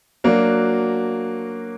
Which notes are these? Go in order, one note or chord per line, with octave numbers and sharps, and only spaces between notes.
F#3 A#3 D4 F#4